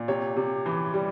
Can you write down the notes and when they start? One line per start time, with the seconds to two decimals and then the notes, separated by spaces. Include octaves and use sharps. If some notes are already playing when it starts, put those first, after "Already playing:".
Already playing: A#2
0.08 C3 C#5
0.36 C3
0.66 E3
0.94 G3